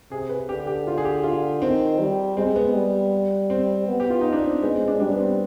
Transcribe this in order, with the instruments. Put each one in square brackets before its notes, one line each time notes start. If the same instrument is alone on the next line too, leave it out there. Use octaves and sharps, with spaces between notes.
[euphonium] C3 [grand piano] G#4
[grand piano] B4
[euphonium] D3 [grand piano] G4
[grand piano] G4
F4
G#4
G4
F4
[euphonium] D#3 [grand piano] C4
[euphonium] G3
[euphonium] G#3 [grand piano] C4
[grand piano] B3
[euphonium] G3
[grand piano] C4
[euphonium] B3
[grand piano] G4
F4
D#4
D4
C4
[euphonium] G#3 [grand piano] B3
[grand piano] C4
D4
[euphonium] G3 [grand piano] D4
[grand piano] B3
C4